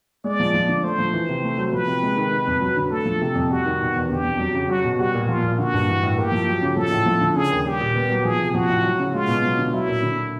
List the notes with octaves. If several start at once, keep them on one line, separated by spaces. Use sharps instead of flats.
G#3 D5
F3
F3
D3
A3 C5
F3
E3
C3
A3
F#3
F3 B4
C3
G#3
D#3
C3
F2
F#3
D3
A3 A4
F3
C3
F2
G3 F#4
D#3
B2
E2
D3 G4
F2
F#3
C#3
F#3 F#4
B2
G3 F#4
A#2
F3 F4
A#2
D3 F#4
G2
E3
A2
A#3 G4
F3
F#3
C#3
F3 A4
A2
F3
D3
C#3 G#4
D#2
G3 G4
A#2
B3
F#3
F3 G#4
C3
F3 F#4
A2
F#3
C#3
G#3 F4
B2
F#3
D3
F#3 E4
A#2
D3